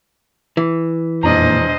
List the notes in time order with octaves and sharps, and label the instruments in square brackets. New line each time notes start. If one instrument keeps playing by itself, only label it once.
[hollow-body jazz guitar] E3
[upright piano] E1 D4 A#5 [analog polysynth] F2 A#2 D#3 [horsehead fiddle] C5 D#5